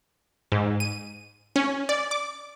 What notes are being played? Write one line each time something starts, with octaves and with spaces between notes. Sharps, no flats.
G#2
D#7
C#4
D5
D6